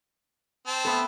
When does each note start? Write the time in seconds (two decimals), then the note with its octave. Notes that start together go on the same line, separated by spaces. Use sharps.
0.67 C4 A5
0.85 A3 B3 A4